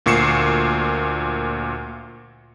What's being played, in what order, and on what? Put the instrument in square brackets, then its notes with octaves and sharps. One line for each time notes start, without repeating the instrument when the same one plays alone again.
[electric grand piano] D2 A#2 C#6 C7 C#7 E7